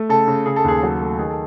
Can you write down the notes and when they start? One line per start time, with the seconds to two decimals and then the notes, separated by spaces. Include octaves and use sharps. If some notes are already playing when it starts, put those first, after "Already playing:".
Already playing: A3
0.09 C#3 A4
0.28 C#3
0.46 C#3 G#4
0.56 A4
0.64 D#2 G#4
0.83 F#3 A4
1.01 A3
1.19 D#3 G#4
1.30 A4